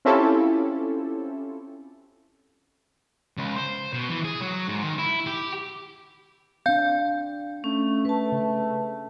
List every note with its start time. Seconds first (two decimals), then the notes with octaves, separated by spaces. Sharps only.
0.05 C4 C#4 E4 F4 G4 A4
3.37 C#2
3.56 C5
3.93 B2
4.09 E3
4.24 G#4
4.41 F#3
4.68 G#2
4.83 D#3
4.98 E4
5.27 G4
6.66 C4 D4 F5 G6
7.64 A3 C#4
8.05 A4 B4 A5
8.32 C#3